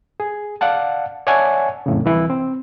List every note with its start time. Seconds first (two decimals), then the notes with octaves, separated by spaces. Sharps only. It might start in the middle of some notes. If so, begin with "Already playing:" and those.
0.20 G#4
0.61 D5 F5 F#5 A5
1.27 C#5 D5 E5 F#5 G#5 A5
1.86 F2 A2 C#3
2.05 C2 E3 E4
2.30 C4